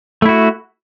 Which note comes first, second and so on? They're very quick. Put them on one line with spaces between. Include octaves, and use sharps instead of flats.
A3 E4 F#4